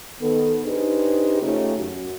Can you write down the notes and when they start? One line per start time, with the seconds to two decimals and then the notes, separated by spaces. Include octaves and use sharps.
0.20 D#3 B3 A4
0.64 D4 D#4 G4 G#4 B4 C5
1.40 C#3 A3 C#4 D#4 F4 G4
1.75 F#2 F#4